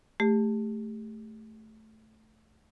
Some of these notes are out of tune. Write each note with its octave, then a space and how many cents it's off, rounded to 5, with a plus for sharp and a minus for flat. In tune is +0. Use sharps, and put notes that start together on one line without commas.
A3 -5 G4 +30